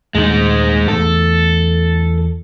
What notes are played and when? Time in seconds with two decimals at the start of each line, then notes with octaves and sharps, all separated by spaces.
0.15 D#2 A#2 G#3 A3 D#4
0.88 E2 A3 A4